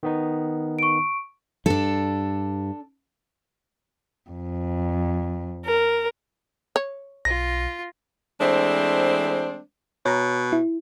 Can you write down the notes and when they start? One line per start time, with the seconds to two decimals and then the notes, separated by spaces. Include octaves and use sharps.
0.03 D#3 B3 D#4
0.79 C#6 D7
1.66 G2 D4 A4
4.31 F2
5.65 A#4
6.76 C#5
7.25 B1 F4 A#6
8.40 E3 G#3 A3 C4 D4 C5
10.05 B2 C#5 A#5
10.53 E4